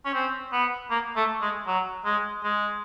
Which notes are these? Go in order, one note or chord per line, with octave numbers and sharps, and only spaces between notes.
C#4
C4
B3
A#3
A3
G#3
F#3
G#3
G#3